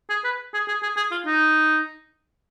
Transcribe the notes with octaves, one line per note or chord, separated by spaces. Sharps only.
G#4
B4
G#4
G#4
G#4
G#4
F4
D#4